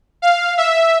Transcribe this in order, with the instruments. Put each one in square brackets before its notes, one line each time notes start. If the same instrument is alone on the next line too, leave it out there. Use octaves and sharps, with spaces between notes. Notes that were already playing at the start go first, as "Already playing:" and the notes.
[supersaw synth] F5
E5